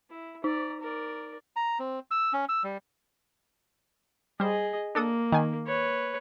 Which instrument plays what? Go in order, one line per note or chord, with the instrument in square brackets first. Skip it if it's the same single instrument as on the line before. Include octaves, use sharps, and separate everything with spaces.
[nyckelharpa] E4
[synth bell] D#4 [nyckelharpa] D5 A#5
[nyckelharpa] A#4 D5
[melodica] A#5
C4
E6
C#4
E6
G3
[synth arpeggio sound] G3 C5 [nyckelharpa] G#4 D#5
[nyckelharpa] A#3 [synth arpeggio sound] D4 A4 D#6
[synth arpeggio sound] D#3 G#5
[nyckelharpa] B4 C#5